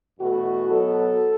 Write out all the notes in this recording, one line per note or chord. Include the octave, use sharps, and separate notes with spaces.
E2 B2 A3 F#4
B2 F#3 B3 A4